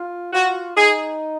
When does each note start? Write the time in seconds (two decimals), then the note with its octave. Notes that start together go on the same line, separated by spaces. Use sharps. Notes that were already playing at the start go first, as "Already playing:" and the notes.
Already playing: F4
0.33 F4 F#4
0.77 D#4 G#4